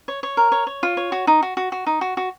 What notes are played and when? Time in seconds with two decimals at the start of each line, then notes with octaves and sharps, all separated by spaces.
0.08 C#5
0.23 C#5
0.37 A#4
0.52 C#5
0.67 C#5
0.83 F4
0.97 C#5
1.12 F#4
1.27 D#4
1.42 F#4
1.57 F#4
1.72 F#4
1.86 D#4
2.01 F#4
2.17 F#4